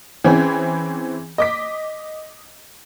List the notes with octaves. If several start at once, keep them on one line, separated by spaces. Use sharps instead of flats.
E3 C4 C#4 E4 G#4
D#5 D6 B6